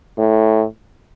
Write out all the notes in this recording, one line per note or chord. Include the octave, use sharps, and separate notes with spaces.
A2